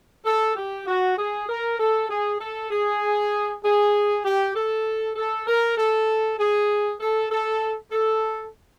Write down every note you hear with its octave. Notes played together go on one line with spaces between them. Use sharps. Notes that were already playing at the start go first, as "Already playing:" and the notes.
A4
G4
F#4
G#4
A#4
A4
G#4
A4
G#4
G#4
G4
A4
A4
A#4
A4
G#4
A4
A4
A4